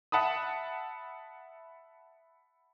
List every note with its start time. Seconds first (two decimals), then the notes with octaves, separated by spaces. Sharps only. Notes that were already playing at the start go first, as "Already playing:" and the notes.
0.12 E5 F#5 A5 B5 D#6